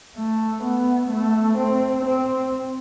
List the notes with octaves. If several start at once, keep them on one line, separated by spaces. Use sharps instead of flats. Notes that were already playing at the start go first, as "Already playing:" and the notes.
A3
B3
A3
C4
C4